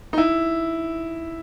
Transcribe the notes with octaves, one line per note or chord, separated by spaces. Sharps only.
D#4
E4